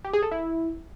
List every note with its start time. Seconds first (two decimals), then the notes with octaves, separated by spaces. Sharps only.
0.04 G4
0.13 G#4
0.22 A4
0.31 E4